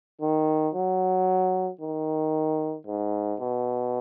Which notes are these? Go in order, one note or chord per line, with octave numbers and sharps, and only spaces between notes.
D#3
F#3
D#3
G#2
B2